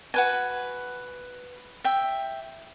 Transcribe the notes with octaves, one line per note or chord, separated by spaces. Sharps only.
F#4 B4 G#5
E5 G5